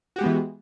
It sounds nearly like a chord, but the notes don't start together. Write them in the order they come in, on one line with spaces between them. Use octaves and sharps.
F#4 G4 G#3 B3 E3